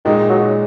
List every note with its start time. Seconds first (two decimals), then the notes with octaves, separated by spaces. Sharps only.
0.05 A#2 D#3 G#3 D#4
0.29 F#3